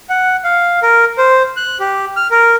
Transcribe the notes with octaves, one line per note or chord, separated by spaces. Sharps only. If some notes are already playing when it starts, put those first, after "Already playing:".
F#5
F5
A#4
C5
F#6
G4
F6
A#4